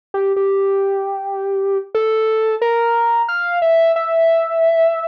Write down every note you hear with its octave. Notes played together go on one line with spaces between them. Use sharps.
G4
G4
A4
A#4
F5
E5
E5